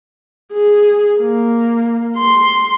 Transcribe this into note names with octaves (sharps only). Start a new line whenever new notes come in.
G#4
A#3
C6